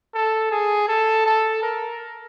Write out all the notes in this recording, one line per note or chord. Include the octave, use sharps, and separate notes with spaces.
A4
G#4
A4
A4
A#4